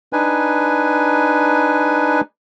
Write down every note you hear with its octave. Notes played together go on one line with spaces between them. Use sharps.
D4 D#4 B4 G#5